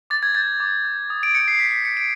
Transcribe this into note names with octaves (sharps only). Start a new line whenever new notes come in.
D6 A6
G#6
G6 A6
D6
G6
D#6
D7
G6 C#7
C7
D#6 B6
B6
G6 C#7
D7